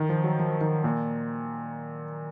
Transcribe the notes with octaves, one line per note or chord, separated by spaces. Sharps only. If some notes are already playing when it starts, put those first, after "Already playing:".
Already playing: D#3
F3
F#3
F3
D#3
A#2